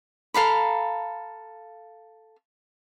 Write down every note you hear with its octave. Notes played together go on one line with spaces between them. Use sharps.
A4 F5 A#5 B5